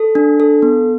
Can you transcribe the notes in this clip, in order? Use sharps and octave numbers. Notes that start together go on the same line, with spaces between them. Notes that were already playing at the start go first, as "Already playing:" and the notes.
Already playing: A4
D4
A4
B3